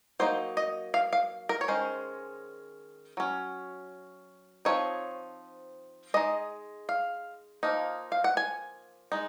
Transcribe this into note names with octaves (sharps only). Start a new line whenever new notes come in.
F#3 A#3 D#4 C5
D#5
F5
F5
A#4
C#5
D#3 G#3 C#4 C5
F#3 C#4
F3 C4 D#4 C#5
G#3 D#4 D#5
F5
F3 A#3 D#4
F5
F#5
G#5
G#3 D#4